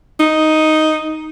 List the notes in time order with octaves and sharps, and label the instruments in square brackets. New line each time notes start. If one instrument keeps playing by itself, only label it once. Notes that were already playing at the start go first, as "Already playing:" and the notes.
[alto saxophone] D#4